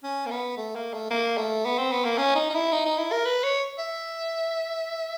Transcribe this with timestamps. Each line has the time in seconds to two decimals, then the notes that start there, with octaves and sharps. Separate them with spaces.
0.03 C#4
0.26 A#3
0.31 B3
0.57 A3
0.75 A#3
0.94 A3
1.11 A#3
1.37 A3
1.65 B3
1.78 C4
1.92 B3
2.05 A#3
2.18 C#4
2.35 D#4
2.50 D#4
2.54 E4
2.72 D#4
2.86 D#4
2.98 E4
3.12 A#4
3.25 B4
3.43 C#5
3.79 E5